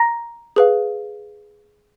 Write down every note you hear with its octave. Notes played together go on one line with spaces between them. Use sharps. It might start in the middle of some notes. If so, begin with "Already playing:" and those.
Already playing: A#5 A#6
G#4 B4 F5